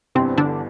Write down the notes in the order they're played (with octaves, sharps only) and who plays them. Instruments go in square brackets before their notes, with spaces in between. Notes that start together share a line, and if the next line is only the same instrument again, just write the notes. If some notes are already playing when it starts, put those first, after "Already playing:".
[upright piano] G1 G2 E3 B3 [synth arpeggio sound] C3 C4
[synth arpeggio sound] D3 D4